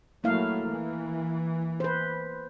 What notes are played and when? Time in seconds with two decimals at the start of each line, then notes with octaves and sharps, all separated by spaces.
0.24 F#3 A3 A#3 E4 F5
0.70 E3
1.80 B4 C5